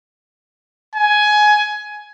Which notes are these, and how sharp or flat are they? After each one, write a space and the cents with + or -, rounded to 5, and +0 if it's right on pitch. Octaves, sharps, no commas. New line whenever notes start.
G#5 +15